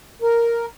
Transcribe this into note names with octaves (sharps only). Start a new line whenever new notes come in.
A#4